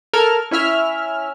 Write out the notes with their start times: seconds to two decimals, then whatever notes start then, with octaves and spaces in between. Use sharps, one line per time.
0.13 A4 A#4 F6 G#6
0.51 C#4 E4 E5 F6